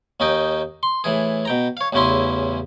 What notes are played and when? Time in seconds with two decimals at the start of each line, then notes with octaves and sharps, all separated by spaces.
0.20 D#2 C#4 D#4 D#5 G5
0.83 C6
1.04 A2 E3 G#4
1.45 B2 G5 A#5
1.77 C#5 F5
1.93 A1 E2 C#3 C#4 E4 C6